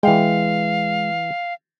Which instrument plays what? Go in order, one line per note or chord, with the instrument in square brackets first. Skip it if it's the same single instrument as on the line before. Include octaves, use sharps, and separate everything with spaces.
[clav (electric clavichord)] E3 G5 [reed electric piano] G#3 [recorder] F5